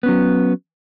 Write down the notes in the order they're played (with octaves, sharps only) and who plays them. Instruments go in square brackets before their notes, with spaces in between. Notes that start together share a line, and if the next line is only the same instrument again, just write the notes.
[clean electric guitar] B3
C#4
F#3